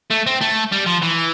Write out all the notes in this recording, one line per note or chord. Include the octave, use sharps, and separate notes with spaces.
A3
C4
A3
G3
F3
E3